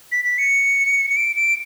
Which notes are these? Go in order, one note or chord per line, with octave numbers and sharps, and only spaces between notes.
B6
B6
C#7
C#7
D7
D7